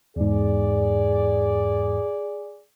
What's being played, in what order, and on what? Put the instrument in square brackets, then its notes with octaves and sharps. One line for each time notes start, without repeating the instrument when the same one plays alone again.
[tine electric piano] E2 G#2 [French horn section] G#4 D5